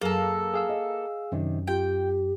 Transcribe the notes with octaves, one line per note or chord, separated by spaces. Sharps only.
F#2 A#3 G#4 A4
G#4 F5 E6
D#5
F#2 C3 D#3 D4
F4 G4 G5